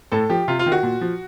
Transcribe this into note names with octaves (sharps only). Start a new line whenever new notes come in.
A2 A4
F3 G4
C3 F4
F4
D#3
F#4
A#2
F3